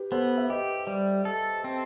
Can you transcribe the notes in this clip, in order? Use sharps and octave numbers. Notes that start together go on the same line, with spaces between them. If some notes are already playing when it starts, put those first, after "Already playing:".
Already playing: G4 B4
B3 A4 C5
E5
G4 B4 D#5
G3
A4
C4